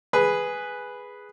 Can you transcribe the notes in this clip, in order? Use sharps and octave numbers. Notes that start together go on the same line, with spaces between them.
G#4 B4